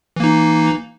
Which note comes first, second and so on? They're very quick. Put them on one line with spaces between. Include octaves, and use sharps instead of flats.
E3 A#3 D#4